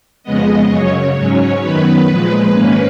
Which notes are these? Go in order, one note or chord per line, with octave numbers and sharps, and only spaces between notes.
F2 C#3 G#3 B3 D#5
F#2 C#3 F#3 C#5
G#2 F#3 C#4
F#2 D#3 F#3 B3 B4
A#2 F3 G#3
G#2 D#3 A#3 C#4 B4